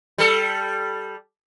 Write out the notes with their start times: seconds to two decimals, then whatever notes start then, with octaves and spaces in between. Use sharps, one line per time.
0.18 G3 A4